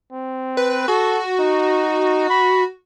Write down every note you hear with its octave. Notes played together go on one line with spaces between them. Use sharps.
C4
B4
F#4 A4
D#4
B5